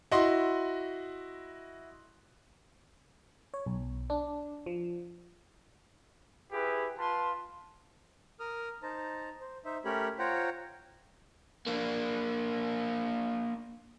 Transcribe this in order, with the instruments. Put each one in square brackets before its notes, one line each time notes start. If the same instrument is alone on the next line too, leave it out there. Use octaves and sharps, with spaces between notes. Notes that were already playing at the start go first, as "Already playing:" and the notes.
[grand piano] E4 F#4 D#5 C6
[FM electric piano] C#5
B1
D4
F3
[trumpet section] E4 G4 G#4 B4
F4 B4 A5 C6
[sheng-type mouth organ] A#4 D#6 F6
D#4 C5 A5 A#5
C5
D#4 C5 E5
A3 C#4 G4 A#4 C#5 B5
F4 C5 C#5 F#5 G5 A#5
[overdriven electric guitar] A#3 D4